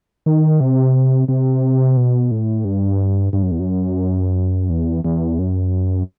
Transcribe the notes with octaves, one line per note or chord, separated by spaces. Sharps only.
D#3
C3
C3
B2
A2
G2
G2
F#2
E2
F#2
E2
E2
F#2